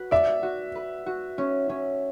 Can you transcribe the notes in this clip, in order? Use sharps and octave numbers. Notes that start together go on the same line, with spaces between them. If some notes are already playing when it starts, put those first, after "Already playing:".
Already playing: F#4 B4
D5 E5
F#4
B4
F#4
C#4
C#4